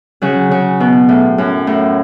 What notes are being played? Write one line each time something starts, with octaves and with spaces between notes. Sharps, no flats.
C#3 F#3
C#3
B2
A2
F#2
A2